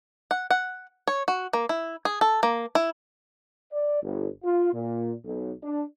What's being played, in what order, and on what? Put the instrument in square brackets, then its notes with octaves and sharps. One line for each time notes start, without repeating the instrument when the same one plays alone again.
[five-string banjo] F#5
F#5
C#5
F#4
A#3
E4
G#4
A4
A#3
E4
[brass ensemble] D5
G1
F4
A#2
B1
D4